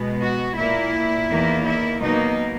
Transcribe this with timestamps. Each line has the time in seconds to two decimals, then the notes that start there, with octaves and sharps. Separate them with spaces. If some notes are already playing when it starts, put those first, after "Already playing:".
Already playing: B2 G#3 B3
0.21 F#4
0.57 A#2 A#3 E4
1.29 E2 D#3 A#3
1.66 E4
2.01 B2 F#3 A#3 D#4